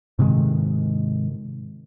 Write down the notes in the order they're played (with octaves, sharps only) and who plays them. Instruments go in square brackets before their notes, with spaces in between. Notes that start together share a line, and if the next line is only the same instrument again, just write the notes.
[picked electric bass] G#2 C3 D#3 G#3